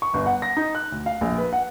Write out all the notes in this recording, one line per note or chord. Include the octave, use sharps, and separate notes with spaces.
C#6
G1
F#5
A#6
D#4
F#6
D2
F5
A#1
B4
F#5